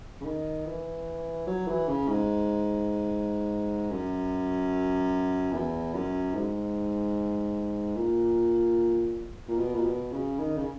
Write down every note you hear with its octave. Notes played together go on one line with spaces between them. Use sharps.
C#3
D#3
E3
F#3
E3
C#3
G#2
F#2
E2
F#2
G#2
A#2
A#2
B2
A#2
B2
C#3
D#3
C#3